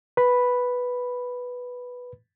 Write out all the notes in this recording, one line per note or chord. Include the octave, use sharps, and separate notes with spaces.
B4 B5